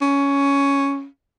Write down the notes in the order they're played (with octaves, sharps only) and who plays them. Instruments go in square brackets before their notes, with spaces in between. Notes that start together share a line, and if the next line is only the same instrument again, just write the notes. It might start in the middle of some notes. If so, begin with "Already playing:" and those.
[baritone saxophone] C#4